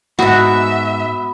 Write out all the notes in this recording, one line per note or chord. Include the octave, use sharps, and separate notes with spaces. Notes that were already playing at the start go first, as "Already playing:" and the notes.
E2 G#2 B3 F#4 E5